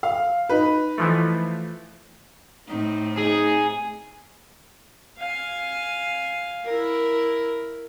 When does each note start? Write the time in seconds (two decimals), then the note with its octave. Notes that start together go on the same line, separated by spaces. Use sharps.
0.03 F5
0.49 D#4 B4
0.98 E3 F3 A3
2.68 A2 C4 D#4
3.18 D#4 G#4
5.18 F5 G#5
6.65 E4 A#4